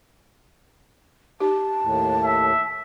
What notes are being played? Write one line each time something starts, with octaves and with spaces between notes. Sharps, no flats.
D#4 G4 A5
D#2 A2
E5